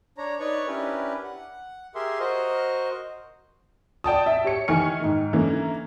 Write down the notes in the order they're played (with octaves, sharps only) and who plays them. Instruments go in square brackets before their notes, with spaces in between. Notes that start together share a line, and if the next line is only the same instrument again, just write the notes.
[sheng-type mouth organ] D4 C#5 A#5
D#4 B4 C#5 D5 C#6
C#4 D4 E4 G4 A#4 B4
F#5
G4 G#4 A#4 E5 C6
F#4 A#4 C5 D#5
[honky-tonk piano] D5 G5 A5 D#6
E5 A5
G4 C#5 C#7
D#3 E3 G#5 C#6 F6 C#7
G#2 D#3
D3 E3 A#3 C#4